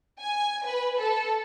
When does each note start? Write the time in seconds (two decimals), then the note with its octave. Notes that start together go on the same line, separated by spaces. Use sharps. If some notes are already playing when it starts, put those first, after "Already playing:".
0.19 G#5
0.65 B4
0.99 A4